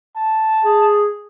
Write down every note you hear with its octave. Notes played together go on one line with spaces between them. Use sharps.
A5
G#4